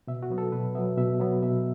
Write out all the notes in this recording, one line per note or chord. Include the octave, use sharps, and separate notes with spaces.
B2 E5
F#4
F#3 B3
A4
B2 B4
F#3 B3 E5
B2 E5
F#3 B3
B2 E5